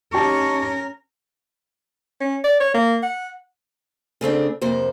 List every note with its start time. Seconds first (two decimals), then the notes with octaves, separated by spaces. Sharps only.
0.13 C#4 D#4 G4 A#4 A5 C#6
2.21 C#4
2.44 D5
2.60 C#5
2.74 A#3
3.03 F#5
4.21 C#3 A3 C4 D4
4.62 F2 C3 A#3 C5